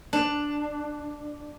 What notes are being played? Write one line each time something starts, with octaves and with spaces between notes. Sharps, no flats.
D4